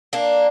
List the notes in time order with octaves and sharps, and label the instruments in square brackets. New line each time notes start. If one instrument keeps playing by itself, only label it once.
[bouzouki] A#3 D4